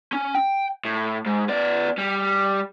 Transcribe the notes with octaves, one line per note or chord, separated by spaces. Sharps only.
C#4
G5
A2
G#2
B3 D5
G3